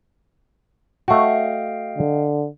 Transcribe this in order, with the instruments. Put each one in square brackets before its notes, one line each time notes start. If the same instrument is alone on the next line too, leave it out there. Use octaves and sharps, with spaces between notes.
[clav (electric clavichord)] A3 F#4 [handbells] D#5 F5 G5
[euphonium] D3